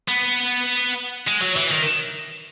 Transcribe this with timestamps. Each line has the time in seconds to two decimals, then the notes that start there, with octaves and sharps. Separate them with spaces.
0.09 B3
1.28 G#3
1.42 F#3
1.56 E3
1.71 D#3